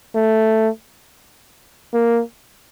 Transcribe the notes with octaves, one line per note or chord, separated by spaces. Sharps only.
A3
A#3